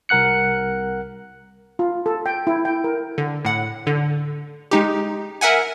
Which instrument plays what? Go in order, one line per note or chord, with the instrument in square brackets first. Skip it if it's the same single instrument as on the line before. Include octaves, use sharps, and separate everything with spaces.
[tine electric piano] C2 A#4 F#5 F#6 C#7
[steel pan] F4
A4
G5
E4
G5
A#4
[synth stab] D3
A2 F#5
D3
G#3 D#4 G4
A#4 E5 F#5 G#5